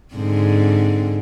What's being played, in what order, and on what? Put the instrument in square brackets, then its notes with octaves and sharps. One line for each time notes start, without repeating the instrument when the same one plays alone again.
[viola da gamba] G#2 D3 C4